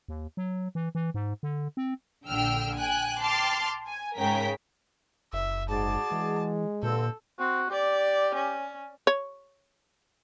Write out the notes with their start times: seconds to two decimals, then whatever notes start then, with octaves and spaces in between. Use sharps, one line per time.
0.08 D#2
0.37 F#3
0.75 E3
0.95 E3
1.14 G#2
1.43 D3
1.77 C4
2.28 A#1 D3 G5 E6 F6
2.78 G5 G#5 F#6
3.22 G5 A5 C6 D6 F6
3.87 G#5
4.18 G#2 C#3 A#4 G5 B6
5.33 F#1 E5
5.69 G#2 F#4 G#4 D5 A5
6.12 E3 G#3
6.83 G2 A#2 D3 C4 A4
7.39 C4 F#4
7.70 G4 D5
8.35 C#4
9.07 C#5